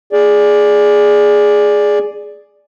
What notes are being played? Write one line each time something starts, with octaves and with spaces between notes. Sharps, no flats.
G#4 D5